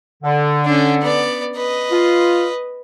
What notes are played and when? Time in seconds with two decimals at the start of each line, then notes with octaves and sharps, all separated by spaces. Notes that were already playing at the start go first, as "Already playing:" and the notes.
0.23 D3
0.65 C#4 D4
1.01 B3 D5
1.56 B4 D#5
1.91 F4